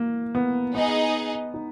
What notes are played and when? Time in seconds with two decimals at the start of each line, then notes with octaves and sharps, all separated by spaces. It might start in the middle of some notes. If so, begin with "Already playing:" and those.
Already playing: A#3
0.35 B3
0.75 B3 D#4 G#4 D#5
1.54 D#4